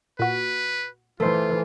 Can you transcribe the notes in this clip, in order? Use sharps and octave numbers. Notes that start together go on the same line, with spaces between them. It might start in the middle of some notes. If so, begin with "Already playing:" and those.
A#2 F#4 B4
E3 A3 F4 C5